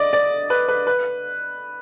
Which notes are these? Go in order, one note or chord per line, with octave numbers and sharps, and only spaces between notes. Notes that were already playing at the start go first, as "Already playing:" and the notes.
Already playing: D5 D#5
D5
B4
B4
B4